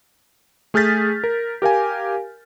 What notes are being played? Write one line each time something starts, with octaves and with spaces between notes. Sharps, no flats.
A3 G#4 F6 G6 A6 B6
A#4
G4 A#4 F5 G#5